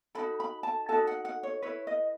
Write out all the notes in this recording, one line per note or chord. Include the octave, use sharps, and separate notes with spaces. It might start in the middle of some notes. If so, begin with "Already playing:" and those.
D#4 F#4 A4 B5
B5
A5
D#4 F#4 A4 A5
F#5
F#5
C#5
E4 B4 C#5
D#5